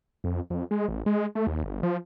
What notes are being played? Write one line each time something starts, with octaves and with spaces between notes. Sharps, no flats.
F2
F2
G#3
A1
G#3
A3
D#2
G1
F3